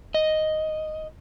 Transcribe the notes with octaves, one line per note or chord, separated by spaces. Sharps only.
D#5